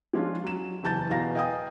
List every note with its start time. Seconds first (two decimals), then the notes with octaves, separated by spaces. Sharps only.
0.13 F3 G#3 C#4 D4 F4
0.44 F#3 E7
0.83 F#1 E2 A5 G6 A6
1.10 E2 B2 E3 F5 A#5 A#6
1.35 D#5 F5 G5 G#5 D#6